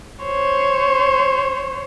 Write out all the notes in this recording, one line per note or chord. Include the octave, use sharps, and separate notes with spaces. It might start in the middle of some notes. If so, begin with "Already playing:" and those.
C5 C#5